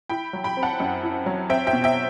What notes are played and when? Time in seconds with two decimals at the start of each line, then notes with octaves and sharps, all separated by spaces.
0.09 E4 G5 B5
0.33 F#3
0.44 G5 B5
0.57 C4
0.62 F#5 A5
0.80 F#2
1.03 E4
1.26 F#3
1.50 C4 E5 G5
1.67 E5 G5
1.73 B2
1.84 E5 G5